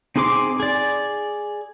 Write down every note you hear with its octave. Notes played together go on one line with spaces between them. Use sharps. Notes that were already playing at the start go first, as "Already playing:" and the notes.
C4 D#4 G#4 C6 D6
G#4 D5